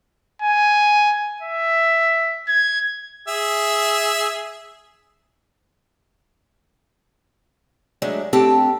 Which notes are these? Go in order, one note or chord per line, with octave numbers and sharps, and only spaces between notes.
G#5
E5
G#6
G#4 E5
F#3 G#3 A3 D4
A3 C4 D4 G4 A4 A5